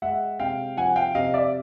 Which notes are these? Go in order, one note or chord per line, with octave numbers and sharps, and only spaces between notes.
G#3 E5 F#5
C3 F5 G5
F3 F#5 G#5
F5 G5
C3 D#5 F5
D5 E5